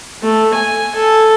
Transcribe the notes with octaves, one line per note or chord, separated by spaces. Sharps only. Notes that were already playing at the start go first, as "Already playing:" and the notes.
A3
G#5
A4